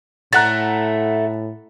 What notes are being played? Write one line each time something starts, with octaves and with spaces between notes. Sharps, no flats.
A2 A3 E5 F#5 A#5 F#6 A6